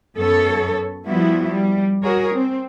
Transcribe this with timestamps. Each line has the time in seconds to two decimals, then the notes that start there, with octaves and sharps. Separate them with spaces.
0.16 F#2 B3 A4 C#5
1.07 F3 G3 B3 E4 F#4
1.51 G3
2.03 F#4 G#4 A#4 C#5
2.34 C4